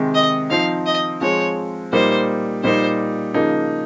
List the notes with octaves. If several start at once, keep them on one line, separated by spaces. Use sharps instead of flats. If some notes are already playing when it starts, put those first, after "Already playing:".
Already playing: C3 D#3 G#3 C4
D#5
F3 C4 D#4 F5
D#5
F3 G#3 C4 C#5
A#2 G3 A#3 D#4 C5
A#2 G3 A#3 D#4 C5
C#3 F3 A#3 D#4